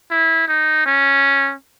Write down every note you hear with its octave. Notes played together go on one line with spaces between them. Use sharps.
E4
D#4
C#4